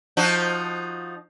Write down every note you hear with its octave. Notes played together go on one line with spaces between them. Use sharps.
F3 D#4 F#4